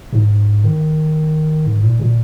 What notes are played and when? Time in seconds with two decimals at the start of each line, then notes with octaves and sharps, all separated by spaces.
0.13 G#2
0.64 D#3
1.66 G#2
1.83 A#2
1.99 A#2